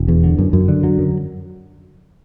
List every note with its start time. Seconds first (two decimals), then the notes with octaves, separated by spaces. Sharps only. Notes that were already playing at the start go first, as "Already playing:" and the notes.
Already playing: E1
0.08 E2
0.24 D3
0.39 F#2
0.53 F#2
0.68 D3
0.84 F#3
0.98 F#2